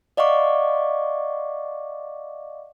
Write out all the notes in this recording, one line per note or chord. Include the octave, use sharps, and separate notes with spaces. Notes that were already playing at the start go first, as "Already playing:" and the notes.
D5 D#5 F5 F#5 C#6 D6